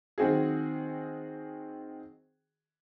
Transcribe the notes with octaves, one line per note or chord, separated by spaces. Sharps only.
D#3 C4 F#4 G#4